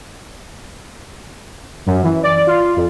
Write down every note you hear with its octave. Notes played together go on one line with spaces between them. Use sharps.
F#2
E3
D5
F4
F2